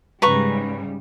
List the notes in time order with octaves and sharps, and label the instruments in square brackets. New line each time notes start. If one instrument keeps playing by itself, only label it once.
[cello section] G#2 C#3 G3 [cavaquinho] B4 A#5 C#6